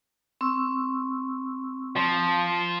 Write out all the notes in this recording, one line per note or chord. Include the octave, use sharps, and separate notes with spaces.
C4 C#6 E6
F3